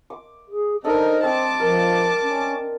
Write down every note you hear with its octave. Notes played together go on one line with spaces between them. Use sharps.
D6
G#4
D4 D#4 A4 A#4 C5 D#5
C4 A5 D6
F3 A#4
C#4